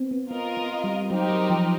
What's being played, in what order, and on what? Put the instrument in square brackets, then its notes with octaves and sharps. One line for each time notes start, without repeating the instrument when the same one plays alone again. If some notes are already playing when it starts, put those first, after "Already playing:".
Already playing: [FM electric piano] B3 C4
B3
[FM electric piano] B3 [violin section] F4 A#4 D#5
[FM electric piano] B3
G3
[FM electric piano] F#3 [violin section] C4 D#4 G4 A#4
[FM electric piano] F#3
F3